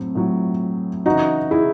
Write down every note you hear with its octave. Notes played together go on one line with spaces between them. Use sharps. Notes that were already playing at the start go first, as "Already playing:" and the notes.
Already playing: A2 F#3 C4
A2 F#3
C#3 E3 D#4 F#4
E4 G#4